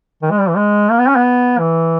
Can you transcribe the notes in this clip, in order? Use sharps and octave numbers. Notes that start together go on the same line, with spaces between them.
D#3
G#3
G3
E3
G#3
A#3
B3
C#4
B3
E3